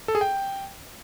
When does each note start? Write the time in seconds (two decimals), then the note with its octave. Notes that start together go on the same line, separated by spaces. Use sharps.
0.08 A4
0.15 G#4
0.21 G5